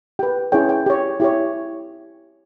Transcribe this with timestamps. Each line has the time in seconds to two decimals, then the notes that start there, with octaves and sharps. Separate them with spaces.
0.19 G4 B4 G5
0.52 C#4 E4 G#4 C#5 G5
0.69 G5
0.86 G4 C#5
1.20 E4 G4 C#5